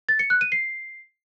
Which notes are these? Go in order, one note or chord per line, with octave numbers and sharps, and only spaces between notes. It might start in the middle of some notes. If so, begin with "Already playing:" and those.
A6
C#7
F#6
D#7
C7